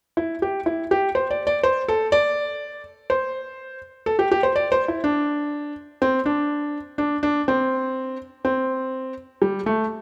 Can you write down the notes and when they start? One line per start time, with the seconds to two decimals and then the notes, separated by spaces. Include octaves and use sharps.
0.17 E4
0.42 G4
0.66 E4
0.91 G4
1.15 C5
1.31 D5
1.47 D5
1.63 C5
1.88 A4
2.12 D5
3.10 C5
4.06 A4
4.19 G4
4.32 G4
4.43 C5
4.56 D5
4.72 C5
4.88 E4
5.04 D4
6.02 C4
6.26 D4
6.98 D4
7.23 D4
7.48 C4
8.45 C4
9.42 G3
9.66 A3